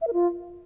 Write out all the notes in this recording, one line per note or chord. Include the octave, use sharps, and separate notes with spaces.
E5
A#4
F4